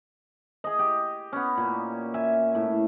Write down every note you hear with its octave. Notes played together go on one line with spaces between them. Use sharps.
G#4 D#5
G4
B3 C#4
A#2
E5 G#5
A2